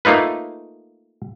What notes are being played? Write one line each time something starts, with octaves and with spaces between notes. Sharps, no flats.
A3 A#3 D#4 F4 B4